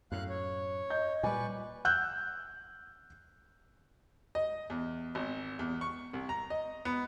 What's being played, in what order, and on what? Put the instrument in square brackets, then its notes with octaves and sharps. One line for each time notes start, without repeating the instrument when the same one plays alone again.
[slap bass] F#2 A2 [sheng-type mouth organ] F5 F#6
[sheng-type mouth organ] C#5
[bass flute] D#5 [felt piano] G6
[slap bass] A#2 G3 [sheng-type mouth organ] B4 D5 C#6 [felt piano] G#5
[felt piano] E6 F#6 G6
[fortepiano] D#5
E2
G#1
E2
C#6
C2
A#5
D#5
B3